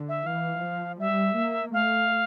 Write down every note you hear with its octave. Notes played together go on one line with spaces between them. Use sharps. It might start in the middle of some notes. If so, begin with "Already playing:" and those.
Already playing: D3
E5
E3 F5
F3
G3 E5
A#3
A3 F5